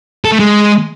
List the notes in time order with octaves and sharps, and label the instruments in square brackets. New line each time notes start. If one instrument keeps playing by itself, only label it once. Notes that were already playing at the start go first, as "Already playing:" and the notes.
[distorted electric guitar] A4
A3
G#3